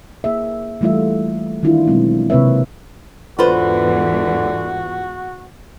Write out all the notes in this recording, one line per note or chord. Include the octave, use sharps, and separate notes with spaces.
A#3 G#4 E5
E3 G3 A3 F4 E5
D#3 E3 D4 E4 F4
B2 F#3 G#3 C4
C3 A#3 C4 B4 C#5 E5
E2 G#2 D3 E3 F4 F#4 B4 C5